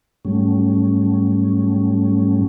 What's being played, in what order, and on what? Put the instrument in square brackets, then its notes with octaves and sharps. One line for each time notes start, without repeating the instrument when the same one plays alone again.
[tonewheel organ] G#2 F#3 G3 A3 C#4